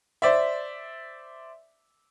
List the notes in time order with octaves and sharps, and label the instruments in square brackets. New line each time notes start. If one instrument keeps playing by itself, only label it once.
[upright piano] C5 D5 E5